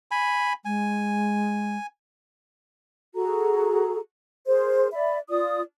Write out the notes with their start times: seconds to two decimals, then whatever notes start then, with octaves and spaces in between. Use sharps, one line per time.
0.11 G#5 B5
0.65 G#3 G#5
3.15 F#4 G#4 A4 A#5
4.47 G#4 A#4 C5
4.93 D5 E5 B5
5.29 F4 D5 D#6